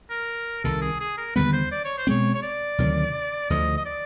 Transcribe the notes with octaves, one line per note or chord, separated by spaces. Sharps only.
A#4
C2 C3 D#3 A4
G#4
G#4
A#4
D#2 D3 G3 B3 B4
C5
D5
C#5
C5
B2 G#3 C4 C#5
C#5
D5
D2 C3 D#3 F#3
D2 D3 F3 D#5
D#5
D5